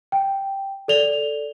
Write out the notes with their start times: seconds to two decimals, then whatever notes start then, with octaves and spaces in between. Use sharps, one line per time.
0.12 G5
0.88 A4 D5 F7 G7